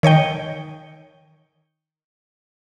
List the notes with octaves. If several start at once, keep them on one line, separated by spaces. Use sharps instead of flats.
D#3 C#5 D#5 G5